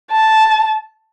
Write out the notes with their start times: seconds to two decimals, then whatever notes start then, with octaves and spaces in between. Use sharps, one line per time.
0.12 A5